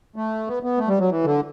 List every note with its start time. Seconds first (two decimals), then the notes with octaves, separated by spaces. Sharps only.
0.16 A3
0.48 B3
0.63 B3
0.78 A3
0.88 G3
0.99 F#3
1.09 E3
1.24 D3